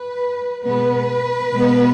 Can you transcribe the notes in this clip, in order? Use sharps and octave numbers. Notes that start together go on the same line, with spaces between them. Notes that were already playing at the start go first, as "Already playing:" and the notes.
Already playing: B4
B2 G#3 B3 B4
B2 G#3 B3